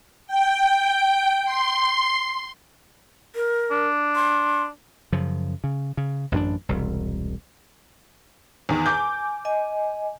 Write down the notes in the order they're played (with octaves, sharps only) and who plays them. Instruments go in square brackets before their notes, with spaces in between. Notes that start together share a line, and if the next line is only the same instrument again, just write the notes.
[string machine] G5
C6
[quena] A#4
[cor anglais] D4
[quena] C6
[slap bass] F#2 C#3 F3
C#3
C#3
A1 F#2 C4 D4
E1 C2
[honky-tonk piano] E2 D#3
[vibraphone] G#5 [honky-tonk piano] D6 G6
[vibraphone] D#5 G#5